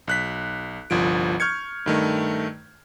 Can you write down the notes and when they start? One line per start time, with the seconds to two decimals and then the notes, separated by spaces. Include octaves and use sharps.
0.07 B1 F#6 B6
0.90 G1 C2 F3 D7
1.40 C#6 F6 G6 G#6 C#7
1.86 G2 D#3 A3